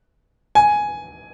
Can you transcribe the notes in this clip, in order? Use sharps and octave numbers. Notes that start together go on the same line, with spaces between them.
G#5